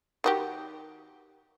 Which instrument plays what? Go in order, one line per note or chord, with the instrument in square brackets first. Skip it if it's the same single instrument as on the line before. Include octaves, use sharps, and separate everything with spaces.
[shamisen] D#3 F#4 G4